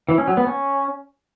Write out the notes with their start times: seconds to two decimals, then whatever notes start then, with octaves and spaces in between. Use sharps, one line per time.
0.09 E3
0.18 C#4
0.28 F#3
0.37 B3
0.47 C#4